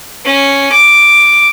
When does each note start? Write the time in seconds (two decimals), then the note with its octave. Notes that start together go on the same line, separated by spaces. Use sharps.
0.24 C#4
0.71 D6